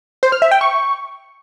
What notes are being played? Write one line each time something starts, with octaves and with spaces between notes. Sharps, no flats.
C5
F6
E5
G5
C#6